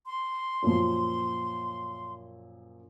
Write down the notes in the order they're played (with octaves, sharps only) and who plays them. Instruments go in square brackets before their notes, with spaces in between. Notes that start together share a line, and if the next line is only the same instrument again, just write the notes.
[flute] C6
[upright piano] F#2 A#2 F3